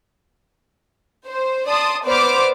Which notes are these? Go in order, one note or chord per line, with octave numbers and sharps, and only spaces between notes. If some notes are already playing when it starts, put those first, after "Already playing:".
C5
D5 A5 C6 D#6
B3 B4 C5 D5 D6 F6